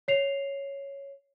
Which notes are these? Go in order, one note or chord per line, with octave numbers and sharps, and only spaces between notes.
C#5 C7 F7